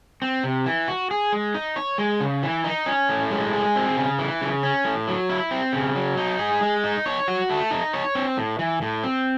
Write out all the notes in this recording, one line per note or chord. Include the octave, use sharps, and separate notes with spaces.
C4
C3
E3
F#4
G#4
G#3
D#4
C#5
G#3
C#3
E3
D#4
C#4
A2
G#3
G#4
C4
C#3
E3
C#3
C#4
A2
F#3
E4
C4
C#3
F#3
D#4
G#4
G#3
D#4
C#5
F#4
A3
D#4
C#5
C4
A2
E3
A2
C4